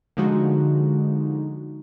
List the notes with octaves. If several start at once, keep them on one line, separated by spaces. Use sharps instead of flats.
D3 F3 G#3 D#4 F#4